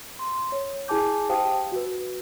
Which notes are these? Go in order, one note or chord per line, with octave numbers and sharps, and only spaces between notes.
C6
C#5
E4 G#4 G#5 A5 D6 G6
G4 C5 F5 G5 A5 D#6
F#4 B4